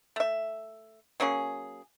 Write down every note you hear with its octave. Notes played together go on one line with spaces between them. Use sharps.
A3 E5
F#3 A#3 C#4 G#4